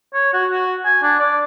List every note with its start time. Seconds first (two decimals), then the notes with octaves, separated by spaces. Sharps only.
0.14 C#5
0.34 F#4
0.51 F#4
0.85 G#5
1.03 D4
1.19 D5